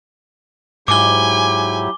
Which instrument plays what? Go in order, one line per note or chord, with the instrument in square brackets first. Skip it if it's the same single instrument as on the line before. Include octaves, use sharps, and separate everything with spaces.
[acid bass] G#2 [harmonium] F#3 E4 G4 [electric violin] G#5 [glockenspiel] D6 G7